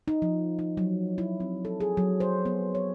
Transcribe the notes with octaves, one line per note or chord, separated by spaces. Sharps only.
D#4
F3
D#4
F#3
E4
C4
A4
G#4
F#3
C5
B3
C#5